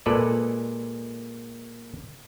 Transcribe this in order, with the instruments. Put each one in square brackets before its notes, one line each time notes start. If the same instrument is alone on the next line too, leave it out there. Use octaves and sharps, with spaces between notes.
[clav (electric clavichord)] A#2 G#3 A4 B4 D5